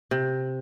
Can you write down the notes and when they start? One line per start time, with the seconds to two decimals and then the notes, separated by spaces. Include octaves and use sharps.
0.11 C3